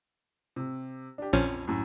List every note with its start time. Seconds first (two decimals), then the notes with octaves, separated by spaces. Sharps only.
0.56 C3
1.18 D4 G4
1.33 A#1 F2 F3 C#4
1.68 F#2 A2